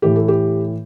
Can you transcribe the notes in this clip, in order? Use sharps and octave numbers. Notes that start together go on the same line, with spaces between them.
A2 E3 G4
A4
G4